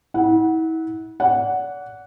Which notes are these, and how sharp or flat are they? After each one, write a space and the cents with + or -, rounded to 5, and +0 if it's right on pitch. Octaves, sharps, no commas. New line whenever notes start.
E4 -35 F#5 +0
D5 -40 F#5 +0